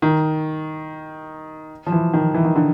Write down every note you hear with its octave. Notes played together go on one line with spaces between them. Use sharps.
D#3
F3
E3
D#3
E3
D#3
D3